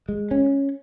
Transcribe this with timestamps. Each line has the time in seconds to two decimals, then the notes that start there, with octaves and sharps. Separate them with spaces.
0.09 G#3
0.31 C#4